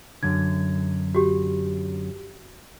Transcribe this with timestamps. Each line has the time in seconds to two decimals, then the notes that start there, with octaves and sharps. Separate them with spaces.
0.23 F#2 D3 G#6
1.15 F#4 G4